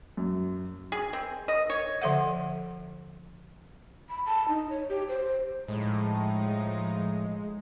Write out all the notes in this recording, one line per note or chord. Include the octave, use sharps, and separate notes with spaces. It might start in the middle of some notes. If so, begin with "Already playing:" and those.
F#2
G#4
C4
D#5
C#5
D3 F3 A4 E5 F#5
B5
A5
D#4
C#5
G4
C5
A2 F3 G#3 D#4